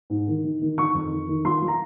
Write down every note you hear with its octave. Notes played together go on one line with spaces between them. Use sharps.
G#2
D#3
D#3
D#3
D#3 C#6
F2
D#3
D#3
F3 C6
F3
A#5